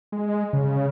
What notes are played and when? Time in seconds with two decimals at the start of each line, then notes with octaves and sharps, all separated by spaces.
0.12 G#3
0.53 C#3